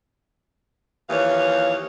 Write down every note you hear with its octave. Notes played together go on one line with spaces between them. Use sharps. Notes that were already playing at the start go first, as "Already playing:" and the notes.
D#2 E3 F3 C#5 F5